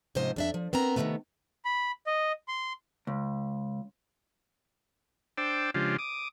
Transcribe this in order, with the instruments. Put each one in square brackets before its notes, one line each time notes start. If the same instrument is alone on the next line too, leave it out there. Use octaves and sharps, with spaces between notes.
[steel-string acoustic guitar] G#2 C3 F3 C#4 C5 D#5
F2 D4 E5
F3
B3 C4 A#4 A#5
C3 D#3 F3 F#3 A3 B3
[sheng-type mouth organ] B5
D#5
C6
[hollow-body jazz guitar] C#2
[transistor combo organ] D4 C5 G5 D6 E6
C#3 F3 G#3 D4 F4 G4
D6 D#6